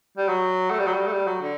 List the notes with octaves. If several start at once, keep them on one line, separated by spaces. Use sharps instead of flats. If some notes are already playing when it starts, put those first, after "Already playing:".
G3
F#3
A3
G3
F#3
G3
A3
G3
F#3
D3